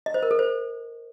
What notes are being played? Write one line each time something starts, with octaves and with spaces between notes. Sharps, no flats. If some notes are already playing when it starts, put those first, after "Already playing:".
D#5
C5
A#4
A4
C5